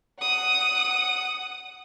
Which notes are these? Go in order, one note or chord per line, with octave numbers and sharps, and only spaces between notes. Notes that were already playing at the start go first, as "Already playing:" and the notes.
F#5 D#6